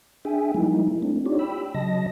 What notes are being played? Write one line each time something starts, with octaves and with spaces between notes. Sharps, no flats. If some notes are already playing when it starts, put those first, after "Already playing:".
D4 G#4 E5 G5 G#5
F3 G3 G#3 A#3 D#4 E4
A3 C4 D4
D4 D#4 F4 G4 C#5 D5
G5 B5 E6
C#3 F#3 D#5 A5 A#6